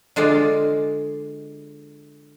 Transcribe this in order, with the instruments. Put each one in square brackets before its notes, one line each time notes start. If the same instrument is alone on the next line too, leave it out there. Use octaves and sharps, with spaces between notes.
[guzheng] D3 G#3 F4 D5